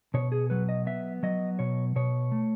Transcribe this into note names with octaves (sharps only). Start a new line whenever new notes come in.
B2 C#5
G#4
F#3 B4
D#5
B3 E5
F#3 D#5
B2 C#5
B2 C#5
A3